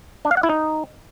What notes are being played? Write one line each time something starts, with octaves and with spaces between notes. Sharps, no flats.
D4
F5
F#5
E4
D#4